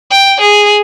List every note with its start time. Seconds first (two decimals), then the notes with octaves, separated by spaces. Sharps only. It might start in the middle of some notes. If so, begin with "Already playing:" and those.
0.10 G5
0.40 G#4